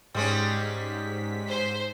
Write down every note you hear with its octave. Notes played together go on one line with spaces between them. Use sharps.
G#2 G3 G#3 C#4 B6
C5